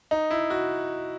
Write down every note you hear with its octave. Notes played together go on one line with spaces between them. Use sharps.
D#4
E4
F#4